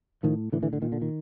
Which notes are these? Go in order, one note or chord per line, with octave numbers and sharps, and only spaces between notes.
A2 D#3 F3
A2 D3 E3
D3 E3
D3
A#2 D#3
D3
D#3